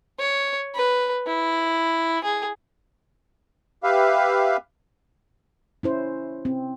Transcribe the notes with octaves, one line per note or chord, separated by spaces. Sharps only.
C#5
B4
E4
G#4
G4 B4 E5 F5
C#4 E4 C5
C4